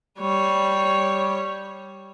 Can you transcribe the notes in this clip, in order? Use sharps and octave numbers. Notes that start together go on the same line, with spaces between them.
G3 C#5